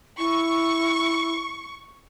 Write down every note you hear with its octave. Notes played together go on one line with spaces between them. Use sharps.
E4 C#6